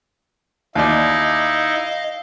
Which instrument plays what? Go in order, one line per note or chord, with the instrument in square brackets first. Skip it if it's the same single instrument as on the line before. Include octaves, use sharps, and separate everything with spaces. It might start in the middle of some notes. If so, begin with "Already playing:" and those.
[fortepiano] D#2 D5 [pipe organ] D#4 E4 [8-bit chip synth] D#5 F5